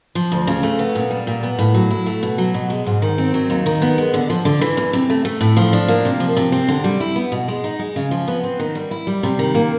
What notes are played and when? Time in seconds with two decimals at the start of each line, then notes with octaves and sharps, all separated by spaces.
0.15 F3
0.32 D2
0.47 C#3
0.63 A3
0.79 B3
0.95 A#2
1.11 G3
1.27 A#2
1.43 B3
1.59 A2
1.74 F#3
1.91 E4
2.06 A3
2.23 B2
2.38 F#3
2.54 B2
2.70 G#3
2.86 G#2
3.02 D#3
3.18 C4
3.34 F#3
3.50 D#2
3.66 D#3
3.82 B3
3.98 G#3
4.14 D3
4.30 F3
4.45 D3
4.61 E3
4.77 E2
4.93 C3
5.10 A3
5.25 A3
5.41 A2
5.57 F3
5.73 D4
5.88 A#3
6.05 C3
6.20 F3
6.37 C3
6.52 C4
6.68 D3
6.84 G3
7.00 E4
7.16 B3
7.32 B2
7.48 G#3
7.64 D#4
7.79 G#3
7.96 C#3
8.11 F3
8.28 B3
8.44 C4
8.59 D#3
8.75 G3
8.91 E4
9.07 G3
9.23 C3
9.39 D#3
9.55 A#3